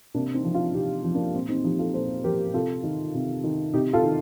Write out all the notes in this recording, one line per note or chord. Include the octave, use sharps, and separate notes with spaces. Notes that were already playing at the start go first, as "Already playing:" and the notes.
C3 A#3 D4
C4 D#4
F3
D4 F4
C3 D#4 G4
F3
A#3 D4
A#2 C4
C4 D#4
F3 D#4 G4
F4 A4
A#2 A4 C5
F3 G4 A#4
C3 F4 A4
D#3
C3
D#3
C3 D#4 G4
F4 A4
D#3